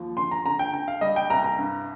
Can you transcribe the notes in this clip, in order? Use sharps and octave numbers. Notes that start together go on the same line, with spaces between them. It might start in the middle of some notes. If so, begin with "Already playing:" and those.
Already playing: D#2 F3
D3 C6
A#5
D3 A#5
G5
D3 G5
F5
G3 D#5
G5
C2 A#5
A#5
G2